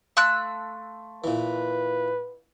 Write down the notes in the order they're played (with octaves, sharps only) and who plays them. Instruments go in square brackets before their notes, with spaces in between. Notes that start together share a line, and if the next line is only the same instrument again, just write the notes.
[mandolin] A3 E6 F#6 [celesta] F5 C6
[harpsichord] A#2 E3 [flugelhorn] B4